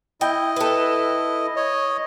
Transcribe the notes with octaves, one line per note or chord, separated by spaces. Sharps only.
E4 D#5 G5
A4 B4
C#5 D#5